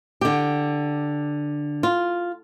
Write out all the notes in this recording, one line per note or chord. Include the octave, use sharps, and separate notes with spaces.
D3 G4
F4